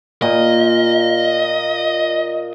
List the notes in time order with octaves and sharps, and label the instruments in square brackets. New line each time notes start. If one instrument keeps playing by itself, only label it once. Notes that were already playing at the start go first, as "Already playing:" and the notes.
[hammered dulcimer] A#2 [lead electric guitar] D#5